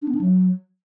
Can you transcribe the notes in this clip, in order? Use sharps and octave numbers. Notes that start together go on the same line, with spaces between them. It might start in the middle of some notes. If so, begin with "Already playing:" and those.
D4
B3
D4
F#3